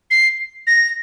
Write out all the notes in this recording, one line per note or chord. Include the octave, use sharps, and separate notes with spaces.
C7
A#6